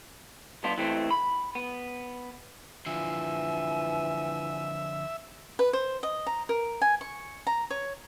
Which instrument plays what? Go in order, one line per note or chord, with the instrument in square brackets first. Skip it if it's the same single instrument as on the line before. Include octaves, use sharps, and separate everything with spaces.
[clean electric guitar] G2 B3 D4 F4
E3 A3 C4
B5
B3
[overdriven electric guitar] D3 F3 [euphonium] E3 [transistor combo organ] E5 [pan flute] G#5
[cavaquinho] B4
C5
D#5
A#5
A#4
G#5
C#6
A#5
C#5